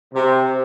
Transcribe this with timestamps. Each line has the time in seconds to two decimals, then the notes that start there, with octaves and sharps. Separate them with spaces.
0.14 C3